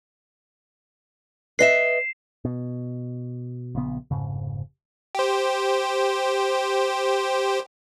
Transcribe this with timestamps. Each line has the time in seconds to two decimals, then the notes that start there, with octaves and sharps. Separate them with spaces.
1.59 B4 D#5 E5 C7 E7
2.45 B2
3.75 A#1 C#3 B3
4.11 F1 G#2 C#3
5.15 G4 C5